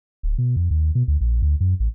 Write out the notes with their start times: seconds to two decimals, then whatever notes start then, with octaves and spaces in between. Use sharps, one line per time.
0.23 D1
0.38 B2
0.56 F2
0.71 D#2
0.95 B2
1.08 D2
1.21 A#1
1.42 D2
1.60 F#2
1.80 A1